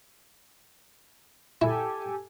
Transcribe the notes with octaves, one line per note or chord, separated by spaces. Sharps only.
E4 G4 A4 G#5